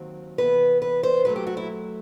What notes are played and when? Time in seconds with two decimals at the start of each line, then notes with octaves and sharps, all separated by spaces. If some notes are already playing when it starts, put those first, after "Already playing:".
Already playing: D#2 D#3 F#3 C4
0.38 C3 E3 B3 B4
0.82 B4
1.03 C5
1.25 F#2 F#3 A3 B4
1.36 G4
1.47 F#4
1.57 E4